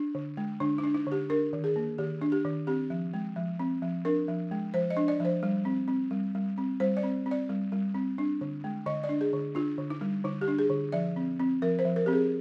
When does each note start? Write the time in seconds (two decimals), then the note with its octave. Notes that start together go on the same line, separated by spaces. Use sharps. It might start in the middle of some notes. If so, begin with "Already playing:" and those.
Already playing: D4
0.15 D3
0.37 G#3
0.60 D3 D4
0.78 D#4
0.84 D4
0.94 D#4
1.06 D3
1.12 G4
1.30 D4 A#4
1.53 D#3
1.64 G#4
1.76 A#3
1.98 D#3 G4
2.22 D4
2.32 G4
2.45 D#3
2.67 C4 G4
2.90 F3
3.14 G#3
3.36 F3
3.59 C4
3.82 F3
4.05 D4 A#4
4.28 F3
4.51 G#3
4.74 F3 C5
4.90 D#5
4.97 D4
5.08 D5
5.20 F3 C5
5.43 G3
5.65 C4
5.88 C4
6.11 G3
6.35 G3
6.58 C4
6.80 G3 C5
6.97 D5
7.03 C4
7.26 C4
7.31 D5
7.49 G3
7.72 G3
7.94 C4
8.18 D4
8.41 D3
8.64 G#3
8.86 D3 D#5
9.04 D5
9.09 D4
9.21 G#4
9.33 D3
9.55 D4 F4
9.78 D3
9.90 D#4
10.01 G3
10.25 D3 D#4
10.41 G4
10.48 D4
10.59 G#4
10.70 D3
10.92 F3 D5
11.16 C4
11.40 C4
11.62 F3 A#4
11.79 C5
11.85 F3
11.96 A#4
12.06 C4 G4
12.13 G#4